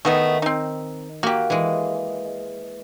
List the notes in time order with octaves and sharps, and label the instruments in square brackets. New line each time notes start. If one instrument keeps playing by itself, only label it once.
[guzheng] D#3 [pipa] A3 B3 D#5
[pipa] C4 D#4
[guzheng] A#3 [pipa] F#4 G4
[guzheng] E3 G#3